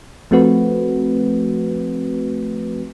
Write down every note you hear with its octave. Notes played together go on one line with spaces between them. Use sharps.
F3 A3 C4 F#4 B4